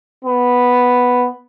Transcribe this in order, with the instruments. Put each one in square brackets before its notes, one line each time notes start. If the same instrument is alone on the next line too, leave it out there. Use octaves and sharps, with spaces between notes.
[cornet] B3